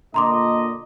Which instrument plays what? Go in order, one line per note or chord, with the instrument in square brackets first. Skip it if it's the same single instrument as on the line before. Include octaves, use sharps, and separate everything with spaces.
[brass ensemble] A#2 D3 D#5 [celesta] A#5 C6 D6